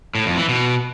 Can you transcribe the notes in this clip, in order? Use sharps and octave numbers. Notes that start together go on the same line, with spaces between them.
A2
F2
E3
B2